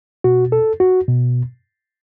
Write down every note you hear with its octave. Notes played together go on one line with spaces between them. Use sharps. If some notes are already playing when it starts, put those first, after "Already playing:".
B2 F#4
A4
F#4
B2